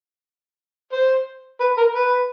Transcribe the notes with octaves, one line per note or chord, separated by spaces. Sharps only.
C5
B4
A#4
B4